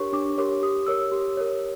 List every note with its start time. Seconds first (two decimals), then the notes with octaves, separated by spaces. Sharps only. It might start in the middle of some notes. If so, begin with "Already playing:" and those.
Already playing: D4 G4 A#4 C#5 C#6
0.13 D4 D6
0.38 G4 A#4 C#5 D6
0.62 G4 D#6
0.87 A#4 C#5 E6
1.12 G4
1.37 A#4 C#5